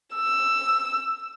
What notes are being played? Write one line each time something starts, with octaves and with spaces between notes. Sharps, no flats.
E6